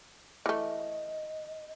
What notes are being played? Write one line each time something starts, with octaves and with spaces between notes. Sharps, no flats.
E3 A3 D#5